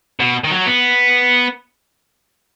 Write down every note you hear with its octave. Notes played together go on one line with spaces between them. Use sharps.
B2
D#3
F#3
B3